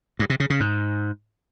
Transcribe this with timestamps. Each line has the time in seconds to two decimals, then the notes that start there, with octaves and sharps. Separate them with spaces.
0.19 G2
0.30 C3
0.40 C#3
0.50 C#3
0.60 G#2